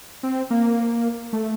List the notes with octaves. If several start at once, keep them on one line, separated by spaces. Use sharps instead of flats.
C4
A#3
A3